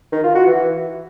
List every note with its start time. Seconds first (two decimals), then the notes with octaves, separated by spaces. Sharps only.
0.13 D#3
0.24 F4
0.35 F#4
0.47 E3